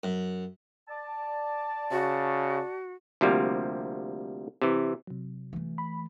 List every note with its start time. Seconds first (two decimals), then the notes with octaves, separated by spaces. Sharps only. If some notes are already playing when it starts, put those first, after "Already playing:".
0.03 F#2
0.89 D5 A5
1.91 C#3 F#4
3.21 D2 C3 F3 G3 A#3
4.62 C3 E3
5.07 C3 F#3
5.53 E3 A3
5.78 B5